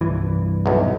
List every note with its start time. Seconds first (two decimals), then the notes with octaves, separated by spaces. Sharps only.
0.01 C2 G2 E3
0.66 B1 E2